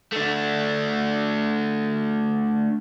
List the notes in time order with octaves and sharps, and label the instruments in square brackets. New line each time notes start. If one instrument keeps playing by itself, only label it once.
[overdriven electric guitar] A3 D4